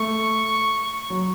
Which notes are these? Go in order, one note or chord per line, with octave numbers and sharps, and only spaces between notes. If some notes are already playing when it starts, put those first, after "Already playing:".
Already playing: A3 C#6
F#3